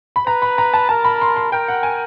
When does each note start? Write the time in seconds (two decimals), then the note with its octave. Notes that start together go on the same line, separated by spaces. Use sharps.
0.16 B5
0.26 B4 A#5
0.42 B5
0.58 A#5
0.73 A5
0.89 A#4 A5
1.05 B5
1.21 C6
1.36 C6
1.52 A#4 G5
1.68 F#5
1.83 G#5